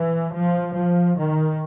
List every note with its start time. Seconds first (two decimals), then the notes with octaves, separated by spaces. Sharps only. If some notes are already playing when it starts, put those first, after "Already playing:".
Already playing: E3
0.32 F3
0.75 F3
1.17 D#3